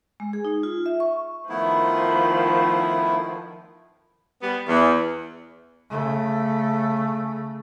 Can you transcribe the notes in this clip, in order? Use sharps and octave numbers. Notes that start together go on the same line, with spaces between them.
G#3
G#4
D#4
F4
E5
C#6
D#3 F3 A3 B3 E4
G3 B3
E2
C#3 A3